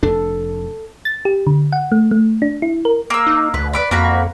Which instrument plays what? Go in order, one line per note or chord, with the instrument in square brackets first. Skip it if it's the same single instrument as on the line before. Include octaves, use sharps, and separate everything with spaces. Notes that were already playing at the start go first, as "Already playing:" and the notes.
[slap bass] F1 D4 [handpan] A4
[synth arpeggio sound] A6
G4
D3
F#5
A3
A3
D4
E4
A#4
[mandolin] A#3 E6
[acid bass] D#4
[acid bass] D2 [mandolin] B4
[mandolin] B4 D5 B5
[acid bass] F2 [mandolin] A#3 F#4 B5